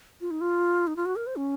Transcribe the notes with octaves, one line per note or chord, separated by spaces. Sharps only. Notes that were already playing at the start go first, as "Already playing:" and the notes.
F4
D#4
F4
D#4
F4
F#4
A#4
C5
C#4